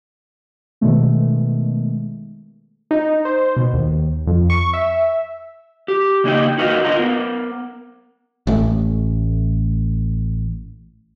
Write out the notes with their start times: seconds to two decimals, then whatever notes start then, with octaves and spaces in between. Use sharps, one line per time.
0.81 B2 D#3 G#3 A3 B3
2.91 D#4
3.25 C5
3.56 B2
3.73 D#2
4.27 F2
4.50 C#6
4.73 E5
5.88 G4
6.24 C#3 A#3 D#4 D5 D#5 G5
6.58 D#4 F#4 A#4 B4 D#5 F5
6.84 D3 F4 D#5 A5 A#5
6.96 B3 A#4
8.47 A1 A3